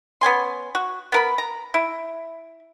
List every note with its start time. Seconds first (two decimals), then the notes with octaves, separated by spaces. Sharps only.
0.21 B3 C#4 G#5 C6
0.75 F#4
1.12 B3 A#4 B5
1.38 A#5
1.74 E4